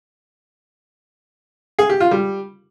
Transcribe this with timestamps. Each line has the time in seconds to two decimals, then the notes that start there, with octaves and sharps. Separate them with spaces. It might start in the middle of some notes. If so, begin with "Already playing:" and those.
1.79 G#4
1.89 G4
2.00 F4
2.11 G3